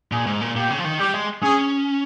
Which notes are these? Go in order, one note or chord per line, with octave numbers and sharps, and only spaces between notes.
A#2 G#4
G#2
A#2
A#2 G4
C#3
F3
D#3
G3 G4
G#3
C#4 G#4